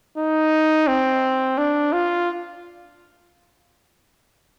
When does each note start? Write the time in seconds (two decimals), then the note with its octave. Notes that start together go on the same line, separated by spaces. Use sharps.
0.18 D#4
0.88 C4
1.58 D4
1.93 F4